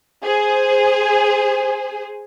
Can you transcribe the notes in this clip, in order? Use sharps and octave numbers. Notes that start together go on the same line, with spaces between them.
G#4 C5